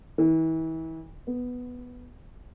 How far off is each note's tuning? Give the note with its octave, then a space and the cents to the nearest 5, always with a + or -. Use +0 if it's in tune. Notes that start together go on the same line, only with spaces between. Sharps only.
E3 -35
B3 +0